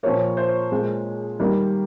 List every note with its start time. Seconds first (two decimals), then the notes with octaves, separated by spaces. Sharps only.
0.03 A#2 F3 A#3 C#5
0.37 C5
0.72 A#2 G#3
1.40 D#3 G3 A#3